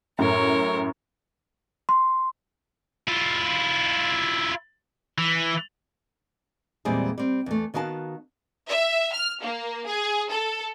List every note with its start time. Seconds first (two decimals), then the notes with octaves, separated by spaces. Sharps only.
0.19 F#2 A2 A#4 C#5
1.89 C6
3.08 E4 F4
5.18 E3
6.85 E2 A#2 G3 G#3 C4 G#4
7.18 G3 C4
7.46 E2 A3
7.74 D#3 B3 F#4 F5 G#5 A5
8.69 E5
9.13 F6
9.41 A#3
9.85 G#4
10.30 A4